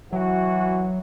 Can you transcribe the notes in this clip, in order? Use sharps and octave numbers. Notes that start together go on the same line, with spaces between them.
E3 F#3 F#4